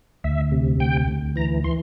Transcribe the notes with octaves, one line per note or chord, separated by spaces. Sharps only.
D2 E5
C3
D2 G5
D2
E3 A#5
E3 C6